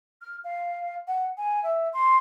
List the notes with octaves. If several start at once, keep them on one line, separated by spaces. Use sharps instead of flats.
F6
F5
F#5
G#5
E5
C6